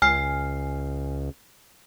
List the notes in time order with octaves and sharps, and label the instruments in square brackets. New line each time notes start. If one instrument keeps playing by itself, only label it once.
[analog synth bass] C#2 [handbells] G#5 F6 C7